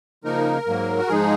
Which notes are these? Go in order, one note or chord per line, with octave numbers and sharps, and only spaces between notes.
C#3 F3 A#3 D#4 A#4
G#2 F#3 A#3
F#4
G#2 F3 G#3 D#4 G#4